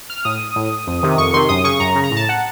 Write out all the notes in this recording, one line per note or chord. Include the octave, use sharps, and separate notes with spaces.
F6
A2 D#6
A2
F2
C3 D#3
F2 C#6
C3 D#3 C6
F#2 D#6
C#3 C#6
F#2 A#5
C#3
A#5
A2
A5
F#5